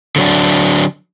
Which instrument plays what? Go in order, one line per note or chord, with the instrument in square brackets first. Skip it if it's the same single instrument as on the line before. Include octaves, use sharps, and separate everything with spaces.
[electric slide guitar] D3 F#3 D4